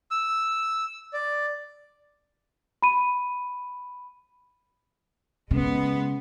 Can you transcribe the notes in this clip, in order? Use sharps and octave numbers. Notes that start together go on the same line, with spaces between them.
E6
D5
B5 D#7
C#3 G#3 B3